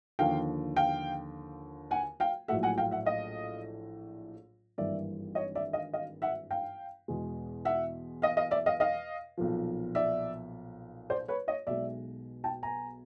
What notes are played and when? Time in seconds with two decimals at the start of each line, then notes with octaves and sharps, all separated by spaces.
0.19 D#2 D3 F3 F5 G5
0.76 F5 G5
1.91 F#5 G#5
2.20 F5 G5
2.48 A#1 A2 F#3 A3 E5 F#5
2.63 F#5 G#5
2.78 F5 G5
2.91 E5 F#5
3.06 D#5 F5
4.78 G#1 G2 E3 G3 A#3 D5 E5
5.35 C#5 D#5
5.55 D5 E5
5.73 D#5 F5
5.93 D#5 F5
6.22 E5 F#5
6.51 F5 G5
7.08 E2 B2 G#3
7.65 E5 F#5
8.22 D#5 F5
8.37 D#5 F5
8.51 D5 E5
8.66 D#5 F5
8.80 D#5 F5
9.38 B1 A#2 F3
9.95 D5 E5
11.10 C5 D5
11.28 B4 C#5
11.48 C#5 D#5
11.67 B1 B2 G#3 D5 E5
12.44 G5 A5
12.63 G#5 A#5